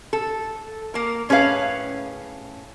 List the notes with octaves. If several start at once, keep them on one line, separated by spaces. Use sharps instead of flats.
A4
A#3 A#4
A2 C#4 G#4 B4 F5